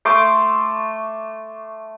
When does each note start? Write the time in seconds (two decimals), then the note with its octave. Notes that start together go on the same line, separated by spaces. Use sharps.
0.05 A3 C6 D6